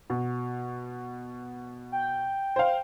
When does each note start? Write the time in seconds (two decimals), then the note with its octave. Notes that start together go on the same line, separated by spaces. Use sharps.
0.10 B2
1.92 G5
2.56 C5 F5